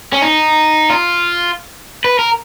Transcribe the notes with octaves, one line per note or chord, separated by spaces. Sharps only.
C#4
D#4
F4
B4
A#4